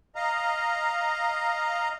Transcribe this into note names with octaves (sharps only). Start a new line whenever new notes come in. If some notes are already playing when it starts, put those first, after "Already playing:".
D#5 F5 A#5